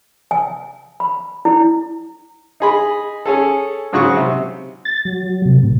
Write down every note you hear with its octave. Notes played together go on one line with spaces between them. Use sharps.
G#5
B5
E4
D#4 G#4 B5
C#4 G#4 A4
G#2 C#3 F#3 F#4 C#6
C3
A6
F#3
C3
A2